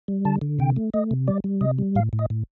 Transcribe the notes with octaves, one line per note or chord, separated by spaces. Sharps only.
G3
D3 A5
D3
C3 G5
A3
A3 D#5
C3
G3 D5
G3
C3 D#5
G3
A2 F5
A2
D#5
A2